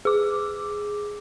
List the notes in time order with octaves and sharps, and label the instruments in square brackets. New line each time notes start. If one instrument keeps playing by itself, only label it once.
[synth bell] G#4 D6